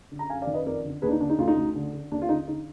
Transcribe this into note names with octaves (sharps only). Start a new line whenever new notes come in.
D3
A#5
F#2 F5 G#5
D5 F5
D#3
B4 D#5
F2 A#4 D5
D3
D#2 D4 G#4 B4
D#4
D3 D4
D#4
D2 F4
D#4
D2
D3
D3
D#2 D4
F4
D3 D#4
D3 D#4